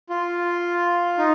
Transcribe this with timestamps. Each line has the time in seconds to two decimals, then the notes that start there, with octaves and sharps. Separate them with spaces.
0.10 F4
1.18 D#4